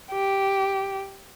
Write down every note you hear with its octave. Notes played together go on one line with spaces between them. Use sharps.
G4